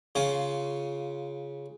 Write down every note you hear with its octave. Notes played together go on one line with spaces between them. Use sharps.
C#3 C#4 F4